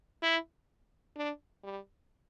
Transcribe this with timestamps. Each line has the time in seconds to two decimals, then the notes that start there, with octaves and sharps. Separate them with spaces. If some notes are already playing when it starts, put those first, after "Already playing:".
0.22 E4
1.16 D4
1.64 G3